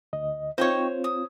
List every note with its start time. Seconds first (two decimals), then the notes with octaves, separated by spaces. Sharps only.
0.13 D2 D#5
0.58 C4 D#4 F4 C5 C#5 G5 C#6
1.04 D#6